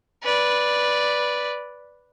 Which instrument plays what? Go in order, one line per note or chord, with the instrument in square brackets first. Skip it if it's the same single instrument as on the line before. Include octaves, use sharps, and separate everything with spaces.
[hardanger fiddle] B4 D5